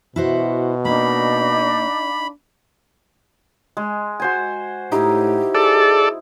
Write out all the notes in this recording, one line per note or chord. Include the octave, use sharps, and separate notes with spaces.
B2 E4 F#4 C5
A#3 D4 D#4 F5 B5
G#3
F#4 C5 G#5
A2 D#4 E4 G4
G#4 A4 D5